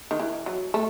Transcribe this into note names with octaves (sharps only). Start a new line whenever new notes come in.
D#3
E3
F#3
A3